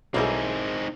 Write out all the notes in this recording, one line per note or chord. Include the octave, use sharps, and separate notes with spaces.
B1 B2 G3 A#3 C4 D#4 E4 G#4